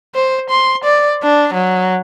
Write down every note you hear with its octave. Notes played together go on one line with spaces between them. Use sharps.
C5
C6
D5
D4
F#3